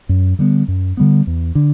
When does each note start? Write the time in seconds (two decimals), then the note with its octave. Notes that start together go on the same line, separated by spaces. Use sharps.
0.09 F#2
0.39 D3 G3 B3
0.68 F#2
0.97 D3 G3 B3
1.27 E2
1.55 D3